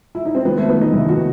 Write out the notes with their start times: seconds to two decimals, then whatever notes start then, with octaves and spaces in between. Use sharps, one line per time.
0.15 E4
0.25 D#4
0.35 C4
0.45 D#3 B3
0.58 A3
0.69 D#3 B3
0.81 D#4
0.93 D#2 E4
1.09 F#4
1.17 D#3